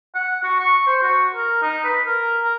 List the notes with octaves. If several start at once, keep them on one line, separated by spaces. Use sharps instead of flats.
F#5
F#4
C#6
C5
F#4
A#4
D#4
B4
A#4
A#4